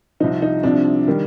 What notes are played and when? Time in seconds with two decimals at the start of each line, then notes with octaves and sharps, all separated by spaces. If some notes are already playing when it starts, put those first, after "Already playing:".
0.20 C2 C3 F3 D#4
0.42 D#4
0.63 C2 C3 F3 D4
1.08 D#3 G3